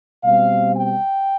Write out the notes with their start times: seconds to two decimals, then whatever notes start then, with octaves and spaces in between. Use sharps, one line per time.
0.24 B2 G3 C4 F5
0.75 G5